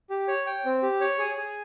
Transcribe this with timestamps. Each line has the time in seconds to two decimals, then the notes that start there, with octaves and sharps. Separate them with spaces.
0.10 G4
0.28 C#5
0.47 G5
0.65 C4
0.82 G4
1.01 C#5
1.19 G#4
1.37 G#4